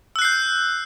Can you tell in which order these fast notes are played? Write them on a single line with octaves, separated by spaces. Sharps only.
E6 F#6 C7 G6